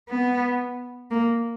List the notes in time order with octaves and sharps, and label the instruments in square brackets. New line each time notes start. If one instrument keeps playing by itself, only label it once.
[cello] B3
A#3